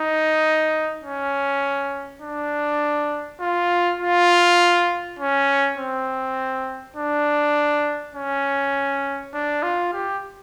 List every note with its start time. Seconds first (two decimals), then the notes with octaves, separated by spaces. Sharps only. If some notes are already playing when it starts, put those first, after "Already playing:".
Already playing: D#4
1.04 C#4
2.22 D4
3.40 F4
4.00 F4
5.19 C#4
5.78 C4
6.96 D4
8.15 C#4
9.34 D4
9.63 F4
9.94 G4